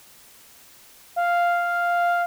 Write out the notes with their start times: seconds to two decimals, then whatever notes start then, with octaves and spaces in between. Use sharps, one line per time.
1.16 F5